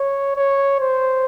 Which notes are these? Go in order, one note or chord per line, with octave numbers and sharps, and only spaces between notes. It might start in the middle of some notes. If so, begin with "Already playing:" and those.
Already playing: C#5
C#5
C5